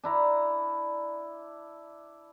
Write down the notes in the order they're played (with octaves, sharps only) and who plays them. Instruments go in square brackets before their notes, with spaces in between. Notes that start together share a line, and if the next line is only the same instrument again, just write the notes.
[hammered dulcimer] D4 E4 A#5